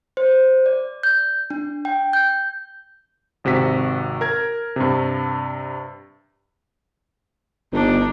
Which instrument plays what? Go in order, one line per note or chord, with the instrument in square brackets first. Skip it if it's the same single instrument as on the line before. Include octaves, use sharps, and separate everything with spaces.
[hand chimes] C5
D5
G6
D4
G5
G6
[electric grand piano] G#1 C3 F#4 B6
A#4 G#6
G2 C3
[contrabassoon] G1 [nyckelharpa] D4 D#4